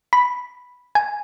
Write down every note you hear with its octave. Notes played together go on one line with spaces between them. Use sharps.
B5
G#5